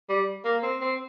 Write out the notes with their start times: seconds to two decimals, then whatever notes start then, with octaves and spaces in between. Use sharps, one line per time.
0.09 G3
0.45 A#3
0.63 C4
0.81 C4